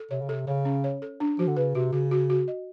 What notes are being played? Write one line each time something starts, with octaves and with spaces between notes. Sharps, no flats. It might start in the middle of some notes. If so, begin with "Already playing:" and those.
Already playing: A4
C3 C#5
C#3
C3 A4
C#3 C#5
C#4
C#5
A4
D4
F3 F#4
D3
C#3 B4
C3 F#4
C#3 F#4
F#4
F#4
D#5